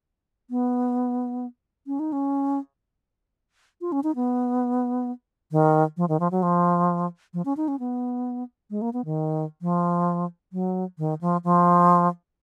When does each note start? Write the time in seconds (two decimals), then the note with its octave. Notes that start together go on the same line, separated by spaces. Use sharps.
0.50 B3
1.87 C#4
1.99 D#4
2.12 C#4
3.81 F4
3.92 C#4
4.03 D#4
4.15 B3
5.51 D#3
5.97 F3
6.09 D#3
6.20 F3
6.31 F#3
6.42 F3
7.34 F3
7.45 C#4
7.57 D#4
7.68 C#4
7.79 B3
8.70 G#3
8.81 A#3
8.93 B3
9.05 D#3
9.62 F3
10.53 F#3
10.98 D#3
11.21 F3
11.44 F3